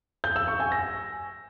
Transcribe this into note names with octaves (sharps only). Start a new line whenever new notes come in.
G6
E6
C#6
G#5
A#6